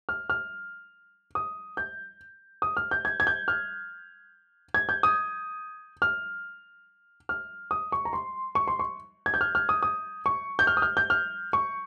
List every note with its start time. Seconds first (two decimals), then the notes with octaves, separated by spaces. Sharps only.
0.09 F6
0.30 F6
1.35 D#6
1.77 G6
2.62 D#6
2.77 F6
2.91 G6
3.05 G#6
3.20 G#6
3.27 G6
3.48 F6
4.74 G#6
4.89 G6
5.03 D#6
6.02 F6
7.29 F6
7.71 D#6
7.92 C#6
8.05 A#5
8.13 C6
8.55 C#6
8.68 C6
8.79 C#6
9.26 G#6
9.34 G6
9.41 F6
9.55 F6
9.69 D#6
9.83 D#6
10.26 C#6
10.59 G6
10.67 F6
10.77 D#6
10.82 F6
10.97 G6
11.10 F6
11.53 C#6